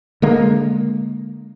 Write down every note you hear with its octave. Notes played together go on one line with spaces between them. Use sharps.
D3 G#3 A#3